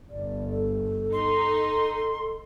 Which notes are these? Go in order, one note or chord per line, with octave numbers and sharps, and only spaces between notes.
G1 D5
A4
D#4 C6